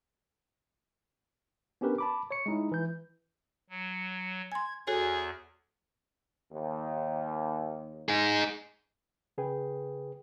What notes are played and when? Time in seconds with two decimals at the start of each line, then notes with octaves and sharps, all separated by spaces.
1.81 B3 C#4 D4 G4 A#4 B4
1.98 A5 B5 D6
2.31 C#5 C#6 C#7
2.46 G#3 D#4 E4
2.72 E3 G6
3.70 F#3
4.52 G#5 C6 G#6
4.87 E2 F#4 G#4 A4 C#5
6.52 D#2
8.09 D#4 G#4
9.38 C#3 G#4 B4 G5